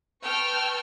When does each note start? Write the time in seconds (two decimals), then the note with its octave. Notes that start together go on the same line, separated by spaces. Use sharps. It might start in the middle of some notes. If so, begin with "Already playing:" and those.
0.22 B4 G5 A5 C#6 E6 F6